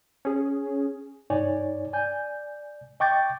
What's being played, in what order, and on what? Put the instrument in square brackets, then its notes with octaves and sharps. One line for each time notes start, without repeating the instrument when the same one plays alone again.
[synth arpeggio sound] C#4 G#4
[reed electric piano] G2 D#4 C#5 D5 G#5
D5 G#5 G6
D#5 G5 C#6 D6 G6 A6